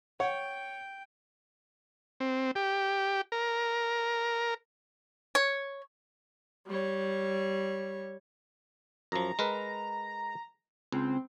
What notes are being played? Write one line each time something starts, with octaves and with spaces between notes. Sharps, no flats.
C#5 F#5 G5
C4
G4
A#4
C#5
G3 C#5
F#2 F3 A#5
G#3 A#4 B4
C#2 C4